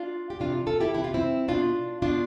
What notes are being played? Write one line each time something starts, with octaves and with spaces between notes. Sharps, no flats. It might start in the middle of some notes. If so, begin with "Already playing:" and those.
Already playing: D4 F4
G4
C3 E3 D4 F4
F4 A4
E4 G4
C3 E3 E4
F4
C4 E4
B2 D4 F4
B2 D4 F4